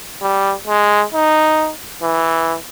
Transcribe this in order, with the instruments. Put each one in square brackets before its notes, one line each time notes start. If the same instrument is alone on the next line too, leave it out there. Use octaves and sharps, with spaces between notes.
[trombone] G3
G#3
D#4
E3